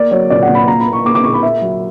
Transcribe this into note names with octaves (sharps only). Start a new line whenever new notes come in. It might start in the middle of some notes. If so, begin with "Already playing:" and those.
Already playing: A#3 D5
F#3 C#5
A#2 D5
F#5
A#2
B5
A#2 A#5
B5
A#3
C#6
A#3 D6
D6
A#2 C#6
B5
A#3 E5
F#3